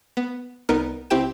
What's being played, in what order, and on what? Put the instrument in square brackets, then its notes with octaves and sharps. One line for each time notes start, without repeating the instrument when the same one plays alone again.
[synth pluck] B3
C2 B3 D#4 A#4 F6
C#2 C4 E4 G4 G5 E7